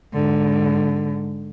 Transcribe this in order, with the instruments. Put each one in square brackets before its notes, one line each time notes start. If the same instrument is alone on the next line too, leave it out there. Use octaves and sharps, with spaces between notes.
[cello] G#2 D3